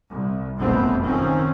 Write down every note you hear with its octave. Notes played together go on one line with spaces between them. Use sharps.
C2
F#1 B1 F2 A3 B3 C4
D#3 F3 C4 C#4